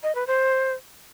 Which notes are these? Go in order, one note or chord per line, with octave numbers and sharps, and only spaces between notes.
D#5
B4
C5